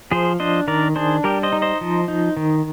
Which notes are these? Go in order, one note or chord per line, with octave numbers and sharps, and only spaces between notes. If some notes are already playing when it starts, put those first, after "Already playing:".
F3 G#4 C5
D4 C5 D#5
D#3 A#4 D5
D4 G#4 C5
G3 G4 A#4
C5 D#5
D#4
C5 D#5
F3
D#4
D#3